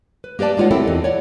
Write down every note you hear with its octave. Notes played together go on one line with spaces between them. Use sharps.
B4
A#3 G4 B4 D5 A5
G#3 D#4 F4 C#5 F#5
C4 E4 G4 A4 A#4
E2 D#5
C#5 D5 F#5